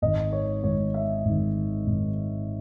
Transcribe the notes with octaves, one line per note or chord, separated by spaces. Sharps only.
G#1 G#2 D#3 D#5
C#5
G#1 G#2 D#3 C#5
E5
G#1 G#2 D#3
G#1 G#2 D#3